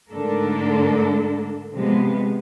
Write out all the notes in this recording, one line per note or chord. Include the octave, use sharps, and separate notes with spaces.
G#2 D3 A3 D4 A4 A#4
C3 F3 G#3 B3